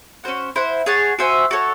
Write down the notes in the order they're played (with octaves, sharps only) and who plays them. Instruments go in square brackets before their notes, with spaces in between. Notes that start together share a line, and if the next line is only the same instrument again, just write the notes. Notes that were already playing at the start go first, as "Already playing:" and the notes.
[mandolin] C#4 F#4 C5 F#5
E4 C5 F#5
G#4 C#5 F#5 A5
F#4 C5 E5 G#5
F#4 A4 C#5